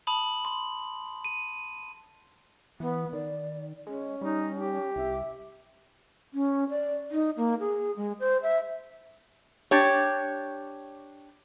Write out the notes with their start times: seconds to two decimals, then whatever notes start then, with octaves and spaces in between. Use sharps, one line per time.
0.07 A5 B5 D#6 F#7
0.45 C6
1.25 D#7
2.80 E3 B3
3.13 D#3 D5
3.87 G#3 C#4
4.21 G3 D#4
4.56 G4
4.96 C2 E5
6.34 C#4
6.70 D5
7.11 D#4
7.37 A#3
7.60 G#4
7.97 G#3
8.20 C5
8.43 E5
9.71 D4 G4 C#5